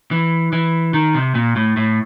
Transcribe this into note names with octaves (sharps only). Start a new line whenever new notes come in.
E3
E3
D#3
C3
A#2
A2
A2